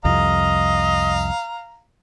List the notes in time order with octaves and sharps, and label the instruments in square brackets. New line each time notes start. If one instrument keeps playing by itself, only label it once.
[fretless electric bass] C2 F2 [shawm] D#5 [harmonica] F5 A#5